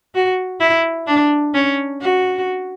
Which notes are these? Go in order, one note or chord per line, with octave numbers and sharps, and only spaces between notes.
F#4
E4
D4
C#4
F#4